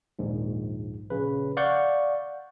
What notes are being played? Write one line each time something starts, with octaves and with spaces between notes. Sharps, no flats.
A#1 D#2 G#2
A#1 C#3 B4
D5 F5 F#5 C#6 G6